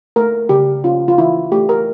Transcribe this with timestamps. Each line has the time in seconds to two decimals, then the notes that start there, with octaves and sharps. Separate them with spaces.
0.16 A3 A#4
0.49 C#3 G4
0.84 C#4 F4
1.08 F4
1.18 E3 E4
1.52 A3 G4
1.69 A#4